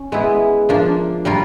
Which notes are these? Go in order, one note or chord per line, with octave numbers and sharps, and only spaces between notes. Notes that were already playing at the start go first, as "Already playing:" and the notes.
Already playing: C#4
G#3 B3 E4
F3 A#3 D4
G3 A#3 D4 F4 A#4